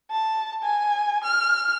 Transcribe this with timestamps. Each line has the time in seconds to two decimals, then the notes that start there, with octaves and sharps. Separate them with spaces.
0.11 A5
0.63 G#5
1.24 F6